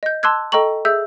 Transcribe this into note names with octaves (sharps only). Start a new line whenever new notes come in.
D#5 G6
A5 C6 D6 E6 F#6 G#6
A4 D#5 G5 A#5 C#6 F#7
G#4 E5 E6 G6